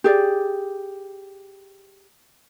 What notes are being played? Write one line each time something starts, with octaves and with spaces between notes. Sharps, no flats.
G4 G#4 D5